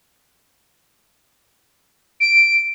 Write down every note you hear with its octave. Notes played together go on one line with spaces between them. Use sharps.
D7